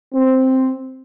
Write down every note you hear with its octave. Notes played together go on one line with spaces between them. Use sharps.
C4